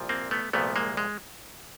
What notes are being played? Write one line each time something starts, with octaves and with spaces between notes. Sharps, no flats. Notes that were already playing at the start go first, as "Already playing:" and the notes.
Already playing: C2 A#2 F3
A#3 C4
A3 B3
C2 A#2 F3 A3 B3
G#3 A#3
G#3